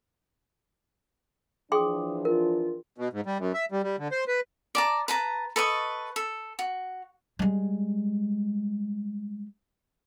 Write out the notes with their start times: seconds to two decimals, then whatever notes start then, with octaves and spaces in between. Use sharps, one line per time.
1.72 E3 F3 D4 G#4 G5 C6 D6 D#6
2.25 F4 A#4
2.98 B2
3.13 G#2
3.26 G3
3.39 F#2
3.54 E5
3.72 G3
3.83 G3
3.98 D3
4.12 C5
4.28 B4
4.75 D5 A5 A#5
5.08 B4 A5 A#5
5.56 A4 B4 D#5 C#6
6.16 A4
6.59 F#4
7.39 G3 G#3